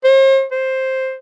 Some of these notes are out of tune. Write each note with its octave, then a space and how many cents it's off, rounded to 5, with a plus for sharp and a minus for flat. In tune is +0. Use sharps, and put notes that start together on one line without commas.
C5 +45
C5 +5